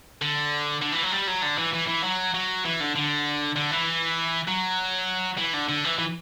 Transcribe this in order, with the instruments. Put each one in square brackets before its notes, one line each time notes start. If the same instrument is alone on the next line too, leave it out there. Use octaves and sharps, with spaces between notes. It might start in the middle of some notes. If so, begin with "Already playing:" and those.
[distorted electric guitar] D3
D3
E3
F#3
G3
F#3
D3
E3
E3
E3
F#3
F#3
E3
D3
D3
D3
E3
F#3
E3
D3
D3
E3
E3